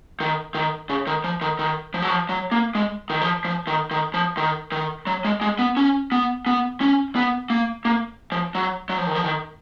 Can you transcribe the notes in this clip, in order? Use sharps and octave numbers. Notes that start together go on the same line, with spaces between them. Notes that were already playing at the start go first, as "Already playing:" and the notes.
D#3
D#3
C#3
D#3
F3
D#3
D#3
F3
F#3
F3
F#3
A#3
G#3
D#3
F3
F3
D#3
D#3
F3
D#3
D#3
F#3
G#3
G#3
B3
C#4
B3
B3
C#4
B3
A#3
A#3
F3
F#3
F#3
F3
D#3
F3
D#3